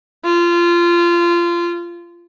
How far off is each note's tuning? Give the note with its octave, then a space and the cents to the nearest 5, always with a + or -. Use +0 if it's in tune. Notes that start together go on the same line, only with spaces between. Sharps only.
F4 -20